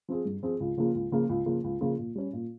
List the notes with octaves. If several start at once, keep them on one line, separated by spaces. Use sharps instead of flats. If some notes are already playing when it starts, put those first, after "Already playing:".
F3 C4 F4 G#4
G2
F3 C4 F4 G#4
C#2
C#3 F3 A#3 F4
C#2
C#3 F3 A#3 F4
C#2
C#3 F3 A#3 F4
C#2
C#3 F3 A#3 F4
A#2
G3 C#4
A#2